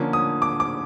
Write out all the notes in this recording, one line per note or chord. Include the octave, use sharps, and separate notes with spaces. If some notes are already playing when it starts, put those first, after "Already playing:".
Already playing: D3 F3 A#3 C#4
D#6
D6
D6